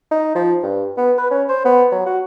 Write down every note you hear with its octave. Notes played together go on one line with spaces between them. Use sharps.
D#4
F3
G2
B3
B4
C#4
C5
B3
F#3
F#4